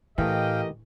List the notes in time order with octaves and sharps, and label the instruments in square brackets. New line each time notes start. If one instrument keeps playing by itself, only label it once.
[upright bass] A2 [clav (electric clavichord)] E3 A3 [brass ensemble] G4 A#4 D#5 [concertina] F5 G5